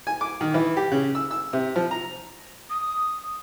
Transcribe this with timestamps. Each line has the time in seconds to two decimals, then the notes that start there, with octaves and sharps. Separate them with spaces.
0.07 G#5
0.21 D6
0.41 D#3
0.54 E3
0.77 G4
0.91 C#3
1.15 E6
1.31 E6
1.53 C3
1.76 F3
1.91 A#5
2.70 D#6